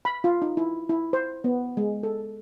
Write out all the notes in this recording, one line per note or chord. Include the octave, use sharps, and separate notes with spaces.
B5
F4
D#4
E4
E4
C5
B3
G#3
A4